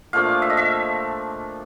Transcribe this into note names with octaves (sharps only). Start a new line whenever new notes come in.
A#2 F3 A3 D4 F5
E5
D#5
E5